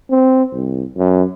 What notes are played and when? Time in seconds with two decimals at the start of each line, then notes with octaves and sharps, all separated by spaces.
0.10 C4
0.52 C2
0.97 F#2